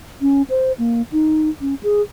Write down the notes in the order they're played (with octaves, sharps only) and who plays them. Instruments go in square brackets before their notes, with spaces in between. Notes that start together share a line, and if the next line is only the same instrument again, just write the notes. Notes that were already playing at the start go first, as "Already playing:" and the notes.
[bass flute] C#4
C5
A#3
D#4
C#4
G#4